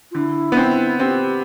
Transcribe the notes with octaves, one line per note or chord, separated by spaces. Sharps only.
F4
D3 E4
B3
C4
C4 G4